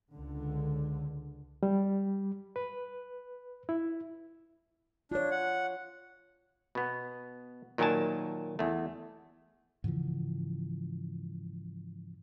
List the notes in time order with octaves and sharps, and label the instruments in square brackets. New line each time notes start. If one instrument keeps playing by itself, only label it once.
[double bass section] C#2 D3
[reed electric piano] G3
B4
E4
[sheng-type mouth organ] D4 [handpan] F4 C#5
[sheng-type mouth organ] F#5
[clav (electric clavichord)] B2 B3
A#2 D#3 F#3 A#4 G#5 A5
E2 A3
[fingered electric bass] G#2 C#3 E3 F3